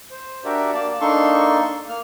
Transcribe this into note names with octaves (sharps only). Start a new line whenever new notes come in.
C5
D4 F#4 G4 A#4 D5 E5
A#3 D5 A5
A#3 D4 D#4 A4 C6 C#6
A#3 F6